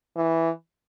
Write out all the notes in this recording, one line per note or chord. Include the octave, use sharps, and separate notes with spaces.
E3